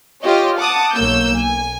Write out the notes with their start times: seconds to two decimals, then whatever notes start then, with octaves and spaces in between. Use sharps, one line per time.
0.23 F4 G4 C#5 D#5
0.57 F#5 A5 D6 D#6
0.95 B1 A#3 C#5 E6 G6
1.35 G#5